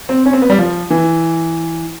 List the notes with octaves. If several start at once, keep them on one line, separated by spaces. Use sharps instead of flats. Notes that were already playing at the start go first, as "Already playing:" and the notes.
C4
C#4
C4
B3
G3
F3
E3